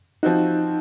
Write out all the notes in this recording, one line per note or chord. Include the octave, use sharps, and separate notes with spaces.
F3 C4 D#4 F#4